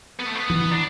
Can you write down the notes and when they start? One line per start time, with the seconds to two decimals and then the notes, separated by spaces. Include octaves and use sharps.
0.19 B3
0.26 A3
0.35 B3
0.50 E3
0.71 D4